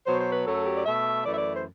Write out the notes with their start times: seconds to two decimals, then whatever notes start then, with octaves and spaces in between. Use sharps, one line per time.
0.07 B2 F#3 B3 C5
0.20 C5
0.32 B4
0.46 F#2 F#3 A3 A4
0.65 G4
0.76 D5
0.85 B2 A3 E5
1.25 F#2 E3 A3 D5
1.33 E5
1.38 D5
1.56 C5